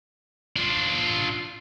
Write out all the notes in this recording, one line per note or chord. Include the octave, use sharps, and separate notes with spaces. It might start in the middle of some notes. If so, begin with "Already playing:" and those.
D4 F4